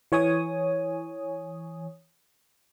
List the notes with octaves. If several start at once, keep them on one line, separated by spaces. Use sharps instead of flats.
E3 C#5 G#5 D#6